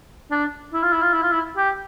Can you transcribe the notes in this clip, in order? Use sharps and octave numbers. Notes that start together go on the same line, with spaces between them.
D4
E4
F4
E4
F4
E4
F4
E4
G4